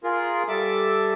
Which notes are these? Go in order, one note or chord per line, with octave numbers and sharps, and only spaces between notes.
F4 G#4 A#4
G3 A4 E5 D6